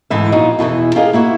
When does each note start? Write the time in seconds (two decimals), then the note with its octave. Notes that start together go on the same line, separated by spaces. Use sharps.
0.10 D2 G#2 E3 E5
0.32 A#2 F3 B3 D#4 F#4
0.59 E2 B2 D3 E3
0.96 F4 G4 G#4 A#4 D#5
1.13 A#3 E4 F#4